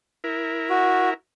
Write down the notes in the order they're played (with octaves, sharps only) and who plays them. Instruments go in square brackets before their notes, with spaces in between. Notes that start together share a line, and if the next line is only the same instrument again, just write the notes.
[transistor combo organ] E4 A#4
[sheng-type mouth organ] F#4